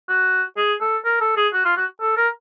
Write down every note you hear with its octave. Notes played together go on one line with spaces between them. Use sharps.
F#4
G#4
A4
A#4
A4
G#4
F#4
F4
F#4
A4
A#4